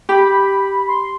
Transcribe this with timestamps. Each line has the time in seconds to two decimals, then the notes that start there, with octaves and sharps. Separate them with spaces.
0.09 G4 B5
0.88 C6